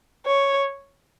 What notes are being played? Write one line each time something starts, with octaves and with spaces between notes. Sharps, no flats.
C#5